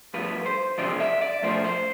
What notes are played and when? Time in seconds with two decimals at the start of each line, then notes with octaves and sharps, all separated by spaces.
0.14 G2 F3 B4
0.46 C5
0.78 E2 C3 F3 D5
1.00 E5
1.22 D5
1.42 B1 A2 F3 C5
1.64 C5